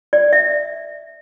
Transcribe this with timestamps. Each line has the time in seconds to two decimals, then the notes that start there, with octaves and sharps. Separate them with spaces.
0.13 D5
0.33 E5